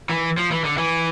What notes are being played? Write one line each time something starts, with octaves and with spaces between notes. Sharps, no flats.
E3
F3
E3
D3
E3